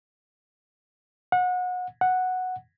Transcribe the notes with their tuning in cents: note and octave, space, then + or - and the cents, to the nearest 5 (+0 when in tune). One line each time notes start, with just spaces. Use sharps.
F#5 -30
F#5 -5